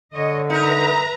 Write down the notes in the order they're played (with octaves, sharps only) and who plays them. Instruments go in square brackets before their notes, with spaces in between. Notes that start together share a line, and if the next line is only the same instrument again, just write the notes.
[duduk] D3 [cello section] C#5 D#5
[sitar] D#4 A#4 [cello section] B4 E5 [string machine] A#5